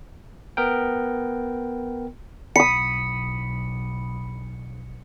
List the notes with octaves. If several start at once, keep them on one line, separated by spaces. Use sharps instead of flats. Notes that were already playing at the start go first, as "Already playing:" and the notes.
B3 A#4 G5
B1 B5 D#6 C#7